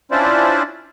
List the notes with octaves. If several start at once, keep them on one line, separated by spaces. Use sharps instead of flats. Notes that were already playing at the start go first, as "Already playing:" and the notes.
C#4 D4 E4 F4 C5 D5